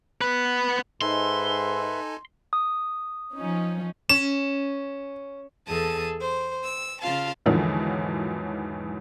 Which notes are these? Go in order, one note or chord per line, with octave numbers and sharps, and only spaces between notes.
B3 B4
G#2 D#4 A4 B4 E5 G#5 C6
D#6
F3 C#4 D#4
C#4 E7
E2 G#4 A4 A5 D#6
C5
E6
C#3 F4 F5 A5
E2 G#2 D3 D#3 F3 F#3